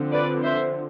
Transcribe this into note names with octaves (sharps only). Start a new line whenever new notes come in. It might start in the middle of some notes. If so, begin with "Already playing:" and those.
Already playing: D3 F3 C4
B4 D5
C5 E5